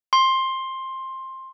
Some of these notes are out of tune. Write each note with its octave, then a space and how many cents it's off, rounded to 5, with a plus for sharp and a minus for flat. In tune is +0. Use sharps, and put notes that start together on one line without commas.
C6 +15